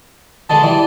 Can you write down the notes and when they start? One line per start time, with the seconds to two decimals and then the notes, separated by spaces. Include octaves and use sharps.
0.50 B2 D3 G#3 A5
0.63 E3 G3 D5